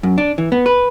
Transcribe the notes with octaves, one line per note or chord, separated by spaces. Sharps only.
F#2
D4
E3
B3
B4